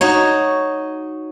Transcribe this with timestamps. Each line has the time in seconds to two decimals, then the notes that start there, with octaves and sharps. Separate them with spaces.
0.01 D#4 F#4 C#5